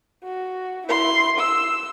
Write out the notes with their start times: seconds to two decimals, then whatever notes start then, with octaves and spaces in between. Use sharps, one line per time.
0.24 F#4
0.87 E4 C6
1.39 E6